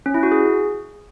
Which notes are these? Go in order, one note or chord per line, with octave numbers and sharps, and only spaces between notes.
C#4
E4
F#4
G#4